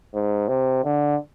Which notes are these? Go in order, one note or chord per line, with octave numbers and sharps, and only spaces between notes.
G#2
C3
D3